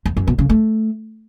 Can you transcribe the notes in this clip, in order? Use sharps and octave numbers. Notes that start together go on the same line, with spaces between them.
E2
F#2
B2
C#3
A3